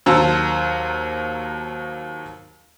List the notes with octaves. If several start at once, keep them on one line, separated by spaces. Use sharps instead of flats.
D#2 F#3 C5 A5 A#5 E6